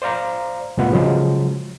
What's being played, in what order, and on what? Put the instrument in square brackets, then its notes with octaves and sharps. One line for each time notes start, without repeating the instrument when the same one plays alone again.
[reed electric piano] C5 D5 F5 A#5
C2 A2 B3 F4 F#5
C#3 F3 F#3 G#3